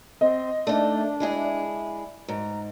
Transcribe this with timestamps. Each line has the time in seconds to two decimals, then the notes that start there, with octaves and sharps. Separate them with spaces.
0.21 C4 D#5
0.67 A3 D4 D#4 D5
1.20 G#3 E4 G#4
2.28 G#2 A#5